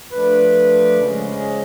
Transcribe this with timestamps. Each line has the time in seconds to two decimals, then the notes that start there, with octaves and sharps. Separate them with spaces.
0.12 F3 A3 D4 B4
1.00 C#3 F3 G#3